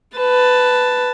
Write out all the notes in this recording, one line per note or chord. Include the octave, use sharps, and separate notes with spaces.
B4 A5